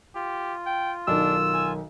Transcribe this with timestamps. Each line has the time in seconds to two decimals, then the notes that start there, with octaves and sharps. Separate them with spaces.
0.15 F4 G4
0.66 G5
1.08 B1 D#3 D4 E6
1.54 G#5